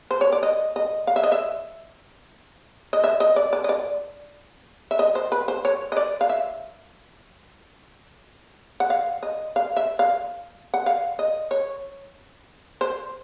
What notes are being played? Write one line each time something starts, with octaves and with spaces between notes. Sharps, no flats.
C5
C#5
D5
D#5
D#5
F5
E5
D#5
E5
D#5
E5
D#5
D5
D5
D#5
D5
E5
D#5
C5
B4
C5
C#5
D#5
D5
F5
E5
F#5
F5
D#5
F5
E5
F5
F#5
F5
D#5
C#5
C5